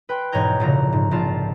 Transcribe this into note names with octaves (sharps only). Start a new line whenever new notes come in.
B4 G5 C6
E1 G#2 C#5 A#5 G6
F1 A#2 C#3 A#5
G#2
A#1 G#2 F4 A5